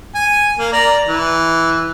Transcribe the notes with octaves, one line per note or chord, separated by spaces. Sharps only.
G#5
A#3
D5 A#5
E3